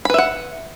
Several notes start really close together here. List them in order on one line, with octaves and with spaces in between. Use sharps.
B5 B4 E5 F#5